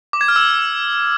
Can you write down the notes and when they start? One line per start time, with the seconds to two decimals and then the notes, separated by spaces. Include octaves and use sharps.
0.13 D6
0.21 G#6
0.28 F6
0.36 E6